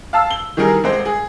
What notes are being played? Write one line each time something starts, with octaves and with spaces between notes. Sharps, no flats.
F5 A5 E6
G7
D#3 E3 G3 G#4 A#4
D#1 G#3 C5
G#4